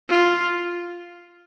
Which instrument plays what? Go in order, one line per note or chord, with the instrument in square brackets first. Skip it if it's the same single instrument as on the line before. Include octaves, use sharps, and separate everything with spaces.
[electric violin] F4